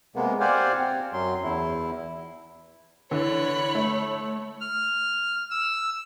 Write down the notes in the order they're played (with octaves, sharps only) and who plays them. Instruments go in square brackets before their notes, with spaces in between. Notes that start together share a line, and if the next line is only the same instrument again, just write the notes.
[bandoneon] C3 G#3 A#3 B3
G4 C5 D5 F5 F#5 G#5
C4
F#2 F#3 C6
E2 E4
[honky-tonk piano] D3 E3 [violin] C#5 B5
[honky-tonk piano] A3
[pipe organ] F6
E6